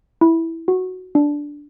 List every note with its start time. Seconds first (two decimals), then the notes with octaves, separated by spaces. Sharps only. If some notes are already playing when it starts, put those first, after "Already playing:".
0.21 E4
0.68 F#4
1.15 D4